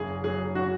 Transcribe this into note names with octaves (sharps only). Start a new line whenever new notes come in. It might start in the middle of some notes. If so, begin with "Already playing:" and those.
Already playing: F#1 G#4
F#3 G#4
F#4